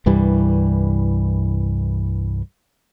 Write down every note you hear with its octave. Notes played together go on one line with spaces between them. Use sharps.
C2 G2 E3 G3